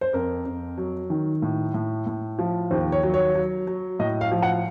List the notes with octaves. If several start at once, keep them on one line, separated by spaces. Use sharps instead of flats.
C5
F2 A#4
F2
F#3
D#3
A2
A2
A2
F3
D#2 C5
C#5
F#3
C#5
F#3
F#3
A2 D#5
F5
F3
F#5